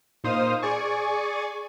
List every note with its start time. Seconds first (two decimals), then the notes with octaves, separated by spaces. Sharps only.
0.24 A#2 D#4 C5 F5 D#6
0.62 G#4 D5 G#5 C#6